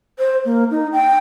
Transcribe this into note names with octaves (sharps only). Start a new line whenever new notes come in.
C5
A#3
D#4
G5